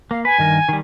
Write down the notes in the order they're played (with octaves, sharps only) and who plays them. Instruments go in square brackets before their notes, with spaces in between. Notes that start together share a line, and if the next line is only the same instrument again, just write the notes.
[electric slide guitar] A#3 [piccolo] F5
[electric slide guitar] B4 [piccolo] G#5
[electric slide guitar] G2 D#3 A#4
D#3 G3